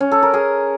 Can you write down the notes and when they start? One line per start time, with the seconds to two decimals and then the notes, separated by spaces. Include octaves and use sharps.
0.01 C#4
0.12 A4
0.23 A#4
0.34 G#4